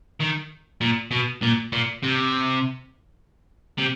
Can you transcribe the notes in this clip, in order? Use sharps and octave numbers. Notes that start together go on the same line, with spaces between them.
D#3
A#2
B2
A#2
A#2
C3
C3